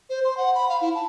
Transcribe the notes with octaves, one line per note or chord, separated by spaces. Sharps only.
C5
C6
F#5
B5
F5
E4
A5